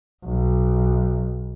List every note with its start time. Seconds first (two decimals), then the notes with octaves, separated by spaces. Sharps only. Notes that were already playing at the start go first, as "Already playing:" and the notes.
0.24 B1